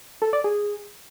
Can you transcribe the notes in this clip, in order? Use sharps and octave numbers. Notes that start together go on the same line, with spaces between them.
A4
D5
G#4